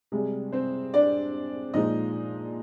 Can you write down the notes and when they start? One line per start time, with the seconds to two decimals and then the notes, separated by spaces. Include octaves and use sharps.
0.12 C3 G3 G#3 G#4
0.52 C4 C5
0.94 D4 D5
1.74 A#2 F3 G#3 D#4 D#5